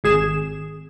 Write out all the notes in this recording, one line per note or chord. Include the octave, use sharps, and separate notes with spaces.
G#1 G#4 E7